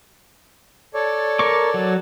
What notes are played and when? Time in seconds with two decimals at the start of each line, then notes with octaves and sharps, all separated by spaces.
0.94 A4 C#5 D5
1.39 A#4 C#6 D6
1.74 F#3